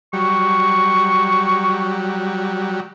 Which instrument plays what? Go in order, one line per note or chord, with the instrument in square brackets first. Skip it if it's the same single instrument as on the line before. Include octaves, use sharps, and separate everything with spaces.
[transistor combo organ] F#3 G3 [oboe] C#6